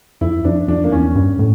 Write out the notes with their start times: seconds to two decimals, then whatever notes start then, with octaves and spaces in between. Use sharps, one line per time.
0.21 F2 E4
0.44 F2 D4
0.68 F2 D4
0.84 A#3
0.92 E2 C#4
1.15 G2
1.39 A2